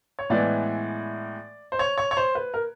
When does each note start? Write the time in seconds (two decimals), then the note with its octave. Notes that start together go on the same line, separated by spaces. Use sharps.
0.19 C#5
0.30 A2 E3 G#3 B3 D5
1.72 C5
1.79 C#5
1.98 C#5
2.11 C#5
2.17 C5
2.35 B4
2.54 A#4